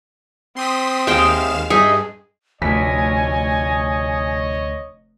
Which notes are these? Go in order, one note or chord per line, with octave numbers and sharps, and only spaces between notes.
C4 C6 D#6 B6
D#2 G#3 E5 F5 G5 D#6 E7
G2 D#4 G#4 D#5 E5
F1 D2 C#5 D#5 G#5 B6